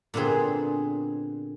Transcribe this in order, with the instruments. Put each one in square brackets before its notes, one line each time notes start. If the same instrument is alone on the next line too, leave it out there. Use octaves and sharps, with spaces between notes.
[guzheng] A#2 D3 B3 C4 G#4